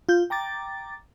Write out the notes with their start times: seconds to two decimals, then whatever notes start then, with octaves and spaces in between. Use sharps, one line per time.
0.09 F4 G6
0.30 G5 A#5 D6 A6